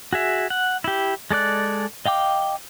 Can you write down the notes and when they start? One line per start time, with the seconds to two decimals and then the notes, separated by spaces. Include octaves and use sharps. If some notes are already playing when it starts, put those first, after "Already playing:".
0.13 F#4 G#4 E5
0.50 F#5
0.84 E4 G4
1.31 G#3 A4 D5 F#6
2.06 D#5 F5 G5 D6